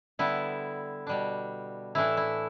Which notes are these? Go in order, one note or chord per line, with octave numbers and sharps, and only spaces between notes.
D3 G3 B3 E4
B2 G3 D4
A2 E3 A3 D4 E4
E4